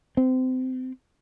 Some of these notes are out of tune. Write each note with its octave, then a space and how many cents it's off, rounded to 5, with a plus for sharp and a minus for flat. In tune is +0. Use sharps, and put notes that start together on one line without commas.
C4 -30